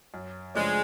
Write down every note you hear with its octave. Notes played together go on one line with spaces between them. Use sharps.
F#2
C#3 F3 G#3 A3 D4